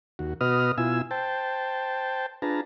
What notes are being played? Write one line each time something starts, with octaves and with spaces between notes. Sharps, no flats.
D#2 F#4
B2 F#4 B4 D#5 D#6 F6
B2 E4 F4 G#5 E6
C5 G5 A5
D4 F4 G#4 B4 A5 A#5